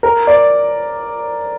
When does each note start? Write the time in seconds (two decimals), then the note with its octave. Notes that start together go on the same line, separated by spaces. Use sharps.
0.03 A#4
0.27 D5